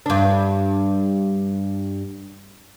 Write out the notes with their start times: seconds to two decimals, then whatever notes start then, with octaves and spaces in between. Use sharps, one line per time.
0.06 G2 D4